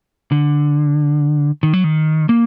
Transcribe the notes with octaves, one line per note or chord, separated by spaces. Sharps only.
D3
D#3
F#3
D#3
A#3